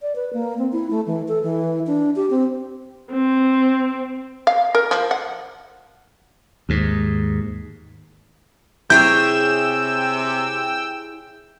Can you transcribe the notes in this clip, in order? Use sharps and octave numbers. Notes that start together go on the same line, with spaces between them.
D5
B4
A#3
C4
E4
A3
E3
A4
E3
D4
G4
C4
C4
F5
A#4
F3
F#5
D#2 G#2
C3 E4 G#4 C#5 G5 E6 G6